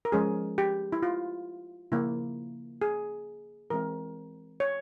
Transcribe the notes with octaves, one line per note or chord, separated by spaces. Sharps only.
A#4
F3 G#3 C#4 G#4
G4
E4
F4
C#3 F3 A#3 E4
G#4
E3 G#3 C4 A#4
C#5